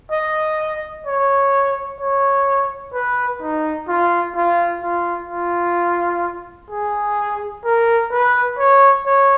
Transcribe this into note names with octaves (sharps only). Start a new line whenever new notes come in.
D#5
C#5
C#5
B4
D#4
F4
F4
F4
F4
G#4
A#4
B4
C#5
C#5